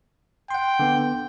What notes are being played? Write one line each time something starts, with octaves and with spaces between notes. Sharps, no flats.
F#5 G5 C6
D3 B3